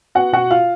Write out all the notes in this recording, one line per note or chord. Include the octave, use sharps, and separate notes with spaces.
B3 F#4 F#5
B2 F#4 F#5
F4 F5